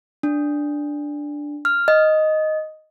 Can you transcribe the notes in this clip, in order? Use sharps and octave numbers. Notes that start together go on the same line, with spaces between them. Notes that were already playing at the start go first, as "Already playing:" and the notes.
D4
F6
D#5